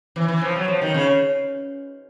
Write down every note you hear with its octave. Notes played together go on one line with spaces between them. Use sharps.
E3
E3
F3
F#3
F3
D#3
C#3